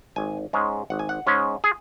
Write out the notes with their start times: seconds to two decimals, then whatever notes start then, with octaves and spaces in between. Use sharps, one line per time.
0.16 G#1 G#5
0.53 G#2 G#3 C#4
0.90 G#1 F#5
0.99 G#5
1.09 F#5
1.27 G#2 G#3 C#4
1.64 G#4